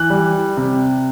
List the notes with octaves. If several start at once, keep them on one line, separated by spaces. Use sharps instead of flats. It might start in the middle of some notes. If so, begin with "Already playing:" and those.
Already playing: E3 F#6
G3
C3